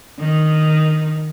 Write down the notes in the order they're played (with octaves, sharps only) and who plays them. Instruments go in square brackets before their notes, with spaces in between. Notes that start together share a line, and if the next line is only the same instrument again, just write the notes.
[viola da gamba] D#3